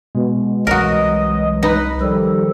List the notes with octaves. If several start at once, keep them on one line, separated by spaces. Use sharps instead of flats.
B2 G#3
C2 E3 F#3 G#3 F#4 A#4 D#5
D#4 B4
D#3 F3 G3 A4